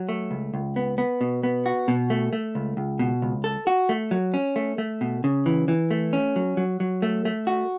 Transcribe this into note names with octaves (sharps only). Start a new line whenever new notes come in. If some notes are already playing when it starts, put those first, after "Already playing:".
Already playing: F#3
A3
C#2
C#2
B3
B3
B2
B3
F#4
B2
A3
A3
C#2
C#2
B2
C#2
A4
F#4
A3
F#3
C#4
A3
A3
B2
C#3
E3
E3
A3
C#4
F#3
F#3
F#3
A3
A3
F#4